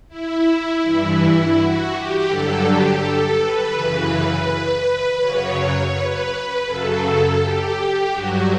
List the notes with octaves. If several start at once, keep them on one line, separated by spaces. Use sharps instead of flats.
E4
G2 E3
F#4
G4
G2 D3 F#3 A4
G4
A4
B4
F#2 C#3 E3
F#2 C#3 F#3 C#5
B4
F#2 C#3 F#3 A4
G4
G2 F#3 F#4